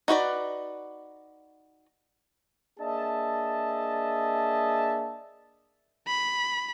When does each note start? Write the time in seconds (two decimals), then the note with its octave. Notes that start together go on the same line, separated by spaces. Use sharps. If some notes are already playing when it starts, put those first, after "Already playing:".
0.08 D#4 F#4 B4 D5
2.80 A#3 D4 G#4 D#5 E5 A5
6.07 B5